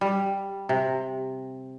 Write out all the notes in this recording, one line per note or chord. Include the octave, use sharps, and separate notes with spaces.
G3
C3